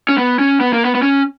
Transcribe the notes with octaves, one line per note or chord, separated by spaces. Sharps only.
C#4
B3
C#4
B3
A#3
B3
B3
C#4